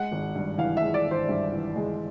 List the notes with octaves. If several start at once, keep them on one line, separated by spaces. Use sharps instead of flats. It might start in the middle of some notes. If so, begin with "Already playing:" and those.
Already playing: G#3 F#5
G#1
G2
E3 F5
G#3 E5
D5
G#1 C5
G2
E3
G#3